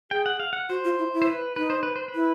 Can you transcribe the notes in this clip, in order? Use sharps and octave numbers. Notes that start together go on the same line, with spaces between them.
G#4 G5
F#5
F5
F#5
F#4 C5
F4
E4
E4
C5
B4
D#4 B4
C5
B4
C5
B4
E4